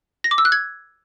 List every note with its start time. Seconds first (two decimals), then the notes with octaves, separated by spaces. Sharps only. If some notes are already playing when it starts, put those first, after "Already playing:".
0.24 A#6
0.31 D6
0.38 E6
0.45 F#6
0.52 G#6